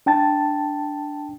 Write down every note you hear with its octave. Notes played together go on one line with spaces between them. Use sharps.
D4 G5 A5 A6